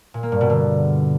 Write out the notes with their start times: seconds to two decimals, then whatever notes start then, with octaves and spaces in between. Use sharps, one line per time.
0.14 A#2
0.23 A#3
0.32 G2
0.41 B2
0.50 D3